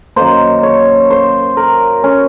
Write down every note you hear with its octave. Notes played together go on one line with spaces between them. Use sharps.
F#2 D#3 A#3 C5
C#5
C5
A#4
C#4